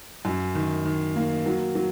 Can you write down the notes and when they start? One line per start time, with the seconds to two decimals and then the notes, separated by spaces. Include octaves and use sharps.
0.25 F#2
0.55 D#3
0.85 D#3
1.16 A#3
1.46 F#3
1.75 F#3